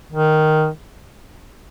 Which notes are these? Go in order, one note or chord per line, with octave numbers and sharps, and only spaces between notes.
D#3